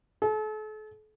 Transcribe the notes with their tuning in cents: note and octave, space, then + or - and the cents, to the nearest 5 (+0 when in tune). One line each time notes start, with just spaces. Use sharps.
A4 -40